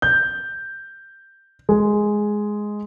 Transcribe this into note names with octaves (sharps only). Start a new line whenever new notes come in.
G6
G#3